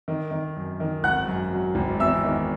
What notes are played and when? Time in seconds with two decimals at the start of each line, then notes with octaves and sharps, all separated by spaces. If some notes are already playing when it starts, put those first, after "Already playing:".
0.08 D#3
0.31 D#3
0.56 F#2
0.80 D#3
1.03 G#1 F#5 F#6
1.27 F#2
1.52 F#3
1.75 G#1
2.00 E2 E5 E6
2.24 D#3